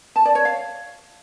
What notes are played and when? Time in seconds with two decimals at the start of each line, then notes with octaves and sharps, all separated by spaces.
0.16 A5
0.25 D5
0.35 C#5
0.45 F5